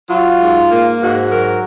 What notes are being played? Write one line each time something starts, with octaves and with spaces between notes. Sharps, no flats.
F#3 F4
G#2
A#3
G#2 F#4
F#3 A#4